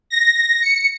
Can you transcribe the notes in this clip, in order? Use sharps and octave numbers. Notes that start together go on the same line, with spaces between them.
A#6
C#7